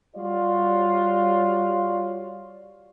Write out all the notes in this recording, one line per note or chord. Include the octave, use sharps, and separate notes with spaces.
G3 F4 F#4 C#5 D5